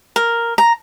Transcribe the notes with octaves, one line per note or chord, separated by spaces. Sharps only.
A#4
A#5